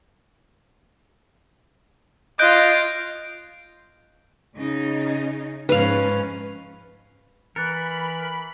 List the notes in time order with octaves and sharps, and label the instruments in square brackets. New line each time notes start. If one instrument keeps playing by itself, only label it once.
[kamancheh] F4 D#5 [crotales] F#6 G6 D7
[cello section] C#3 D#4
[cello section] G#2 F3 C#4 [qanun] B4 F5
[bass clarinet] E3 [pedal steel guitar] A#4 [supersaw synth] B5 [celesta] F#6 A6 C#7